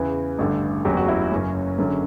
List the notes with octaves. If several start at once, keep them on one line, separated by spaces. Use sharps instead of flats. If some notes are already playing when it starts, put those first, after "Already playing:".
Already playing: E2 C#3 E3 B3
A1 G2 D3 A3
F#1 E2 C#3 F#3 G4
F#4
E4
F#2 C#3 F#3 C#4
F#1 F#2 D3 F#3